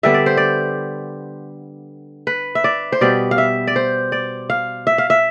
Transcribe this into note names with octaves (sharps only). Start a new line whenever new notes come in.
D3 G3 B3 E5
D5
C5
D5
B4
E5
D5
C5
B2 G3 B3 D5
F5
E5
D5
C5
D5
F5
E5
F5
E5